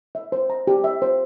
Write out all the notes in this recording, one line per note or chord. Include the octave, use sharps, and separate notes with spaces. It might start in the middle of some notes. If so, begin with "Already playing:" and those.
E5
C5
A#5
G4
E5
C5